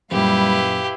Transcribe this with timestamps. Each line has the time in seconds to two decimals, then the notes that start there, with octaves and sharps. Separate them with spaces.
0.11 F#2 A#2 G3 E4 G4 B4 F5